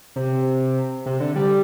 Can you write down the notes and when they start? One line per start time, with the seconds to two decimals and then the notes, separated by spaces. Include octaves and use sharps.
0.16 C3
1.06 C3
1.20 D3
1.36 G3